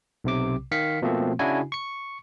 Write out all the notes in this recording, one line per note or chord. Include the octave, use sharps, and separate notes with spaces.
B1 C3 D6
D#3 F5 B6 C#7
B2 F3 A3 A#3 C4
C#3 D4 E4 F#4 G#5
C#6 C#7